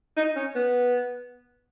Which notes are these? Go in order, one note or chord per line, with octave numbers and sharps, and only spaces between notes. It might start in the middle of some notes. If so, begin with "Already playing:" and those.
D#4
C#4
B3